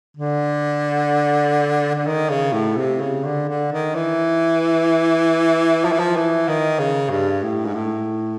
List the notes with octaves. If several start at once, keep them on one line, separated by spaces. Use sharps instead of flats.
D3
D3
D#3
C#3
A2
C3
C#3
D3
D3
D#3
E3
F3
E3
F3
E3
D#3
C#3
G2
A2
G#2
A2